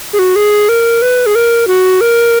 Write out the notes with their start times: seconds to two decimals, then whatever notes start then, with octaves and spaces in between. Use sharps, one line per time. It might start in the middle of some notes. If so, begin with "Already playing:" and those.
0.13 G#4
0.19 F#4
0.36 G#4
0.69 A#4
1.02 B4
1.26 G#4
1.35 A#4
1.68 F#4
2.01 A#4